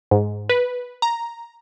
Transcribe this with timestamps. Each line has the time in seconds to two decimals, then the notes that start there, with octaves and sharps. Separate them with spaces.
0.11 G#2
0.49 B4
1.02 A#5